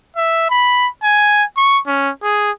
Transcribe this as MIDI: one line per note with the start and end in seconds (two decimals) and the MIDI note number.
0.16 0.49 76
0.50 0.87 83
1.03 1.43 80
1.57 1.79 85
1.87 2.10 61
2.23 2.51 68